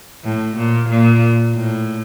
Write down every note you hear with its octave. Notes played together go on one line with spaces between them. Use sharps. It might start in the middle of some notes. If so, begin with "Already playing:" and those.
A2
A#2
A#2
A2